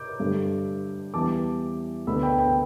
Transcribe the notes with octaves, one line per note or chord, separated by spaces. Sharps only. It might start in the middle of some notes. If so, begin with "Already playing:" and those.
Already playing: D6 G6
G2 D3 A3
E2 E3 G3 A5 D6
D2 D3 B3 B5 E6
G5 B5
G5 B5